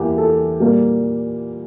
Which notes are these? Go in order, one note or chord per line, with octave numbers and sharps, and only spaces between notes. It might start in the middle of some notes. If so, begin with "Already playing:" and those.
Already playing: E2 E3 A#3 G4
A4
A#2 G3 A#3